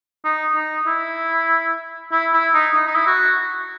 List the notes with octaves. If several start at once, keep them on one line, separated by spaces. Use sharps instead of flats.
D#4
D#4
E4
E4
E4
D#4
D#4
D#4
E4
F#4